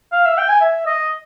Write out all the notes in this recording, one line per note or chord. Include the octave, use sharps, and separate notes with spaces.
F5
E5
G5
G#5
E5
D#5